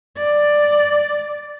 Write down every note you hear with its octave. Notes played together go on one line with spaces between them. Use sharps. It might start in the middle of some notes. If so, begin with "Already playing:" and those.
D5